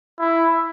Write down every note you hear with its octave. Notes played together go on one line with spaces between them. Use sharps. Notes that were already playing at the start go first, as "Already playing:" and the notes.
E4